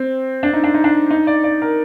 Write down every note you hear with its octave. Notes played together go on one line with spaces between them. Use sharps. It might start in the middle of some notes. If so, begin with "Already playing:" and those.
Already playing: C4
D4
D#4
D4
D#4
D4
D#4
D5
D5
A#4